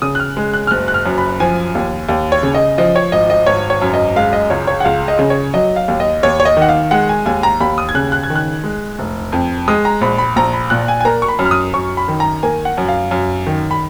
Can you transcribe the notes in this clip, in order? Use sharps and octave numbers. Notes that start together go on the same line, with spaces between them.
C#3 D#6
F#6
F6
G#3
F#6
F6
F#1 F#6
F#6
F6
F#2
B5
F3 G#5
D#2
D#2
C#5
C#3
D#5
F3 D#5
C#5
G#1 D#5
D#5
G#1 C#5
C#5
F#2
D#5
G#3 F5
D#5
C#2 C#5
C#5
F#5
C#2 F5
D#5
C#3
C#5
F#3 D#5
F5
D#2
D#5
D#2 C#5
C#5
D#5
D#3
F#5
F5
G#3 F#5
G#5
D#2 G#5
A#5
D#2 B5
D#6
G#6
C#3 F#6
F#6
G#6
D#3
F#6
G#3
F1
F2
G#3 D#6
A#5
A#1 B5
B5
A#1 A#5
B5
A#2 F#6
G#5
G#5
A#3 A#5
C#6
B5
F#2
F6
D#6
F#2 C#6
B5
D#3
A#5
A#3 G#5
F#5
F#2
F5
F#2
D#3
B5